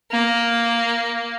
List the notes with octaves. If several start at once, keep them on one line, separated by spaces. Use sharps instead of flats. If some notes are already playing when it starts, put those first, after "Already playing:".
A#3